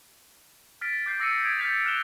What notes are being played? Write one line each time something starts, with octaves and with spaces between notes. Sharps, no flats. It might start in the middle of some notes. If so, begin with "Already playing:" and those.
F6 A6 B6 D7
D6 G6 C7
D6 E6 A#6 C7 C#7 D#7
D#6 G#6 B6 D7
F6 G6 A6 B6 F7
F6 F#6 D7 E7 F7 G7